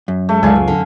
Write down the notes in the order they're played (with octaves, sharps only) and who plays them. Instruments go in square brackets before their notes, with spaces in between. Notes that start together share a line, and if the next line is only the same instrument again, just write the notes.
[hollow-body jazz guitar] F#2
[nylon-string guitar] G#3 [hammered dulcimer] A3
[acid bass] C#2 [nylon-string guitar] D3 G3 G#3 [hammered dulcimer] F5 G#5
[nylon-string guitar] E2
D3